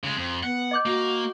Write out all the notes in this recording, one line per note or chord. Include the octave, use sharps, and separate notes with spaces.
C#3 G#3
F2
B3 F#5
D#5 D6 G6
A#3 F#4